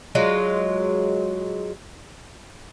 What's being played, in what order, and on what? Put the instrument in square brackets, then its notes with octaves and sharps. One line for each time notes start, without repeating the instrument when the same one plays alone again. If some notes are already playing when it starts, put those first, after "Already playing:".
[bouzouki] F#3 G#3 F4